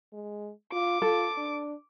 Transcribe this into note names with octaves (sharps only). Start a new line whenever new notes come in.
G#3
F4 D6
F4 A4
D4